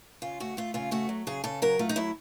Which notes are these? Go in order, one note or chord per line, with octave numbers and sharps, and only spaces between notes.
C#3 F4
A3 F#4
A3 F4
C#3 F4
A3 F#4
F#3
C#3 G#4
C#3 A4
F#3 A#4
A3 F4
D#4
F#3 E4